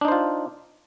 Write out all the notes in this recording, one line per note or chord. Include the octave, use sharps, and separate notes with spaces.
D4 D#4 F4 C5